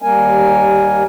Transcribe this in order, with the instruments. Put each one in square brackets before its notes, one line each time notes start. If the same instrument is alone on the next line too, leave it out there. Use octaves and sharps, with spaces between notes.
[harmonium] D#2 G3 A#3 A#4 G#5